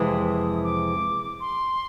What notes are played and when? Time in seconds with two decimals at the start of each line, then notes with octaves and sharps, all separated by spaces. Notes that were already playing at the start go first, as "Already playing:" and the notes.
Already playing: F2 C3 E3 G#3 D#6
0.63 D6
1.40 C6